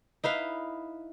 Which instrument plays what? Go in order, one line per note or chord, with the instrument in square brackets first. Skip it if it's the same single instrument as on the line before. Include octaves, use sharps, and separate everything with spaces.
[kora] D#4 E4 B4 F5